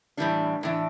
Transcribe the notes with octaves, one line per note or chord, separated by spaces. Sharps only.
A2 E3 G3 D4
A2 E3 D4